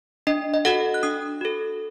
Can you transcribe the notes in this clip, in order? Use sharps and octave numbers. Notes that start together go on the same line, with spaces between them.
D4 D#5
D#5
F#4 A4 F#5
F#6
D4 D#6
F#4 A4